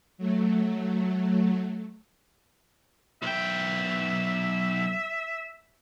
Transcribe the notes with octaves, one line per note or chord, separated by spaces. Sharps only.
F#3 A3
B1 E5 G5